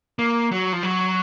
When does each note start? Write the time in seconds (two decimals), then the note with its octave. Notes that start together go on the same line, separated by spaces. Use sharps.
0.19 A#3
0.52 F#3
0.73 F3
0.83 F#3